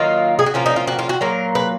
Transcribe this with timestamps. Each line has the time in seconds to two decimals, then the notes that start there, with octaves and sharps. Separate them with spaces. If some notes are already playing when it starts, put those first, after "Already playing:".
Already playing: D#3 F#3 A#3 D#4 F4
0.39 G#4
0.46 F#4
0.54 F3 A#3 C#4 F4
0.66 D#4
0.76 F4
0.87 F#4
0.99 F4
1.09 F#4
1.21 A#2 F#3 A#3 A#4
1.55 B4